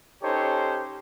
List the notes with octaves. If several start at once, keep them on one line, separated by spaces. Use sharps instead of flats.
C#4 D#4 G4 A4 C5 C#5